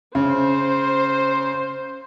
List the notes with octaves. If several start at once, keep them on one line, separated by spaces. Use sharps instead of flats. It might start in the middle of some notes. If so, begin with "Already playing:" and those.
C#3 C5